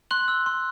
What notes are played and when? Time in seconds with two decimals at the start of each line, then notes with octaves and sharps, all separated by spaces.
0.11 C6 F#6 F#7
0.28 E6
0.46 C6